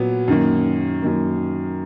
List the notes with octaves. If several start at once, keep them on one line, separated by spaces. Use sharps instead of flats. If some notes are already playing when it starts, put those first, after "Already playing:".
Already playing: A#2 F#3 B3
F#2 D#3 A#3
F#2 D#3 A#3